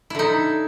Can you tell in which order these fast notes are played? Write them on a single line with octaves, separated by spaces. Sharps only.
E4 D3 D#4